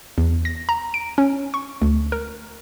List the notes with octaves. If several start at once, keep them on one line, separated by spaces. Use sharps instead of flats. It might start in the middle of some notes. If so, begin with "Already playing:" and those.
E2
A#6
A#5
D7
C#4
C#6
D2
A#4